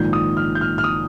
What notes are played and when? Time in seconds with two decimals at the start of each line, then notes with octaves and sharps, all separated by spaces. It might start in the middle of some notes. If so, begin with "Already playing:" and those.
Already playing: A#1 G#2 D#3 G6
0.13 D#6
0.37 F6
0.55 G6
0.61 F6
0.78 F6
0.84 D#6